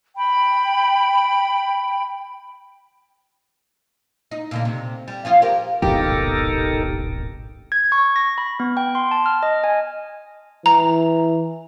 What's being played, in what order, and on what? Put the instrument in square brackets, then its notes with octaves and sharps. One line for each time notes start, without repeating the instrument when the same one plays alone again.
[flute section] G5 B5
[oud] D#4
A#2 D3 A#3
C3
G3
F3 C#4 F4
G4 A#4
[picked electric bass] D1 G#1 B2 [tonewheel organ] D#4 A4 A#4 [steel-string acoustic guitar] G4
[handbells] G#6
C#6
A#6
B5
B3
G5
C6
A5
F6
D#5
G#5
[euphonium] E3 [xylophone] A#5